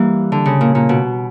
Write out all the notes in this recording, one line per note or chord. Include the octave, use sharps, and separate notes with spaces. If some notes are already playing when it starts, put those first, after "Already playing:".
Already playing: E3 G3 A#3
D3
C#3
A#2
A#2
B2